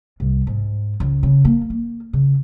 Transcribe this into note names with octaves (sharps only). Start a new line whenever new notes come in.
C2
G#2
C#2
C#3
A#3
A#3
C#3